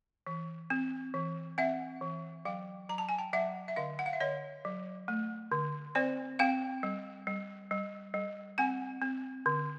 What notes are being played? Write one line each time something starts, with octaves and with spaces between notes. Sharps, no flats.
E3
C4
E3
C4 E5 F#5
E3
F#3 F5 G5
F#3 A#5
A5
G#5
G5 A5
F#3 E5 F#5
E5
D3 D#5 F5
F#5
F5
E5
D3 C#5 D#5
F#3
A3
D3
C4 C5 D5
C4 F5 G5
G3
G3
G3
G3
C4 F#5 G#5
C4
D3